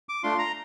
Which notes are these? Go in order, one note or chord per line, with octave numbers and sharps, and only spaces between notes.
D6
A3 D4 F4 C6
A#5